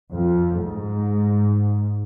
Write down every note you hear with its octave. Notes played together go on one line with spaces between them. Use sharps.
F2
G#2